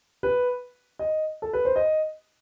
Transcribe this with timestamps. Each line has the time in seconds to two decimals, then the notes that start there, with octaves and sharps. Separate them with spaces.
0.23 B4
0.99 D#5
1.42 A4
1.53 B4
1.65 C5
1.76 D#5